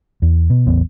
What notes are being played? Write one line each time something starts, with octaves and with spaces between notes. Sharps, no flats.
E2
B2
A1 E2 B3